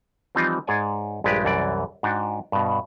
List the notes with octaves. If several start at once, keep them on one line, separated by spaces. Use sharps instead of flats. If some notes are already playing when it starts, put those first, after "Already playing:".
E3 F3 G3 C4 D#4 F4
G#2 G#4 C#5 D5 G#5
A#1 G2 G#3 G4 B4 D5
C2 F#2 E3 D5
G#2 D4 F#4 G5
G2 B2